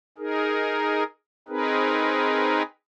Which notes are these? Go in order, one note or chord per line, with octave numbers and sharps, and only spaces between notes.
D#4 G#4 A#4
C4 D#4 G#4 A#4 B4